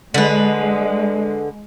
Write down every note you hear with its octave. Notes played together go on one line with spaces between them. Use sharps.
D3 G#3 B4